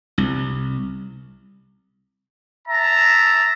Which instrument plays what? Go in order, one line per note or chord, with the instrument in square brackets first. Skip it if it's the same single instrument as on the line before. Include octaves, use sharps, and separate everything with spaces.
[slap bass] C2
[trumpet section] E5 A5 A#5